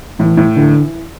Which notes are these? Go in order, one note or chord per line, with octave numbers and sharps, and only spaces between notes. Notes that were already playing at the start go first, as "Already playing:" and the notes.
A2 E3
A2
D3 E3